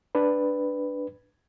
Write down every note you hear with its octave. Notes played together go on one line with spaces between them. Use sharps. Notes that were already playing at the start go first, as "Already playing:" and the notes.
D4 B4